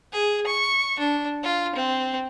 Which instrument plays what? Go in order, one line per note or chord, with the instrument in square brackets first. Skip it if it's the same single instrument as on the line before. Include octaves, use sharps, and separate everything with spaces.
[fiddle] G#4
C#6
D4
F4
C4